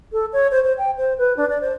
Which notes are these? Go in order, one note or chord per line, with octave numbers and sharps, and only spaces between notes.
A4
C#5
C5
C5
G5
C5
B4
D4
D5
C5